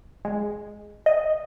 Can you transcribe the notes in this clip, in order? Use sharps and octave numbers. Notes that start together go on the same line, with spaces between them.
G#3
D#5